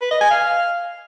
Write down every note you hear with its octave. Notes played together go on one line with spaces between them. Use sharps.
B4
D#5
G#5
F5